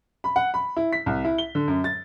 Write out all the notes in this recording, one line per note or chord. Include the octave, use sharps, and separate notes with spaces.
B5
F#5
B5
E4
B6
C2
E4
G7
D3
F#2
A6